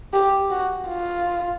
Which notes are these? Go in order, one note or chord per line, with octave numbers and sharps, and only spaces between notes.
G4
F#4
F4